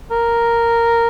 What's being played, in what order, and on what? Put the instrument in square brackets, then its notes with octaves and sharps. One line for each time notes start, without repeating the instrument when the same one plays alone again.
[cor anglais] A#4